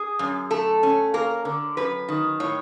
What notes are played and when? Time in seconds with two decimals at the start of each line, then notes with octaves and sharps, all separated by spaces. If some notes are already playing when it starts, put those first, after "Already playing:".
Already playing: G#4
0.19 F#2
0.51 A3 A4
0.83 C#4
1.14 A#3 A#4
1.45 D3
1.77 F#2 B4
2.09 D#3
2.40 A2 C#5